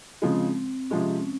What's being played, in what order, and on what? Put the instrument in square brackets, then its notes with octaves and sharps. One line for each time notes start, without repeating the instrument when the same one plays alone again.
[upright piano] C#3 F3 G#3 [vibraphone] C4
[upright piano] C3 F3 G#3 [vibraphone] C#4